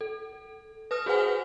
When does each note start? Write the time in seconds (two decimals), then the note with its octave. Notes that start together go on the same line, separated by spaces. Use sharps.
0.01 A4
0.91 B4 D#6 F6
1.06 F#4 G#4 B4 C5 F#5 G#5